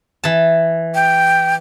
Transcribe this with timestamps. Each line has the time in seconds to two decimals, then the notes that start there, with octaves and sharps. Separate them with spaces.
0.24 E3 A5
0.95 G5